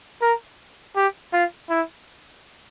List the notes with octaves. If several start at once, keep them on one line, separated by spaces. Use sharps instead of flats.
A#4
G4
F4
E4